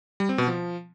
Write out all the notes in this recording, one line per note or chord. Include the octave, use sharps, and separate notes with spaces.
G3
C4
B2
F3